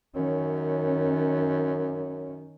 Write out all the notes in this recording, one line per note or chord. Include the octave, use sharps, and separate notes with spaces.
F#2 D#3 C#4